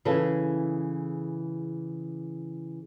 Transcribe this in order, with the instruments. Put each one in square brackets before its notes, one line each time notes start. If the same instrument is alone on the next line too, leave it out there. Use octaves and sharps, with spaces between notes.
[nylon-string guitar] C#3 E3 E4 G#4 A4